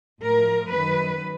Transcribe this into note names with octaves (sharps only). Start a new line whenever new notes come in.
A2 F3 A#4
F#2 D#3 F#3 B4